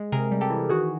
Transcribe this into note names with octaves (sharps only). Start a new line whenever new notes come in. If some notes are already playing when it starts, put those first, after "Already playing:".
Already playing: G#3
C3 G#4 A#4
G3
G4 A4
E3
D#3 F#4 G#4